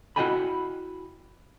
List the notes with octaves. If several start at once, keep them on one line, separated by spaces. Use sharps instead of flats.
E4 F#4 D#5 G5 G#5 B5